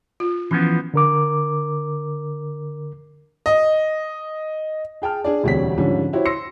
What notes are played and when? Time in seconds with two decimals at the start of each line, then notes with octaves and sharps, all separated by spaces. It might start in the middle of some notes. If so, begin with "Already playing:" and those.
0.20 F4
0.51 E3 F3 B3 C#4
0.94 D3 A#4 D6
3.46 D#5
5.02 G#4 G5 A5 F6
5.24 D4 G#4 D5
5.44 E1 D2 G3 C4 C#5 B6
5.78 G#2 D3 F3 G3 C#4
6.13 E4 F#4 G4 C5 C#5
6.25 C6 E6 A#6 C#7